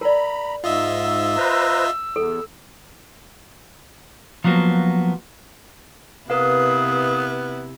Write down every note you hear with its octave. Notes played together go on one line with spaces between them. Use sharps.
A#4 D5 A#5 B5
G#2 F4 D#5 E5 E6
B4 C5 A#5
E2 A4
F3 F#3 A#3 B3 F#4
C3 B3 E4 A#4 B4 F5 D#6